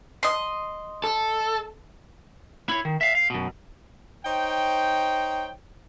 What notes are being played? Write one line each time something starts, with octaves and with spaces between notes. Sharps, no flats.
D#5 C6
A4
E4 C#5
D#3
E5 F5
F5
F#2 B2
D#4 C5 C#5 G5